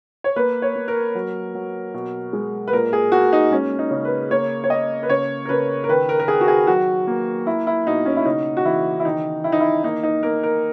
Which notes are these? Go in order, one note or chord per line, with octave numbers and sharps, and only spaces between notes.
C#5
A#3 B4
C#5
A#3
A#4
F#3
F#3
B2
G#3
B4
A#2 A#4
G#4
A#3 F#4
D#4
G#3 C#4
D#4
C#3
B4
A#3 C#5
C#5
A#3 D#5
B4
C#3 C#5
A#4
C#3 B4
A#4
D#3 B4
A#4
A#4
D#3 G#4
F#4
G#4
F#3 F#4
A#3
A#3 E4
E4
B2 D#4
C#4
E4
C#3 D#4
F#4
E3 E4
E4
D#3 D#4
D#3 E4
D#4
E4
A#3 D#4
D#4
A#3 A#4
A#4